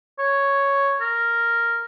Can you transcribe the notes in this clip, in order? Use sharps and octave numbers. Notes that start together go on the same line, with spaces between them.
C#5
A#4